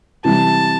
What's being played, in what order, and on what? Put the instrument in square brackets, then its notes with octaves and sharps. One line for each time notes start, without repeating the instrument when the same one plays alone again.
[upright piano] C3 E3 G3 [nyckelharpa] A5